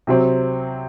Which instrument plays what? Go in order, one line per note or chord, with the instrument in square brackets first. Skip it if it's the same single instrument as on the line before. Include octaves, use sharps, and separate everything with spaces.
[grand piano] C3 F#3 C4